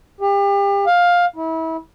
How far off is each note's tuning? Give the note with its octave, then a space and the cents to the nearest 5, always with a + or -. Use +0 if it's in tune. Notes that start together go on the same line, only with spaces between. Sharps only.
G4 +35
F5 +10
E4 -30